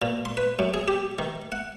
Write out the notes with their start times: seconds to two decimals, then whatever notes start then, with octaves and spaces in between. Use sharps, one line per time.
0.02 A#2
0.25 C6
0.37 B4
0.59 F#2
0.74 G#4
0.88 G4
1.19 D#3
1.52 F#5